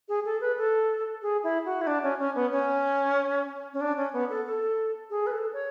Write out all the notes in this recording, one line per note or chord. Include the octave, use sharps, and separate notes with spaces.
G#4
A4
B4
A4
G#4
E4
F#4
E4
D4
C#4
C#4
B3
C#4
C#4
D4
C#4
B3
A4
A4
G#4
B4
A4
C#5